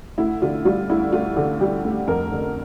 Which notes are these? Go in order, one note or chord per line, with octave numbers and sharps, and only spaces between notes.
D2 E4
D3 F4
G3 F4
D2 E4
D2 F4
D3
G3 G4
D2
F2 A#4
D3